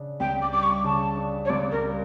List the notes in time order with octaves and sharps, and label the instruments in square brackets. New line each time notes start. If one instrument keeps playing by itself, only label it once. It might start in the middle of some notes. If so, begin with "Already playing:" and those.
Already playing: [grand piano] C#3 D4
[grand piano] C#2 [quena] G5
[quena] D6
[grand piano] G3 [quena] D6
[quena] C#6
[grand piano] C#3 [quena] A5
[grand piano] D4
[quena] C#5
[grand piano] C#2 [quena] D5
[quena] A#4
[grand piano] G3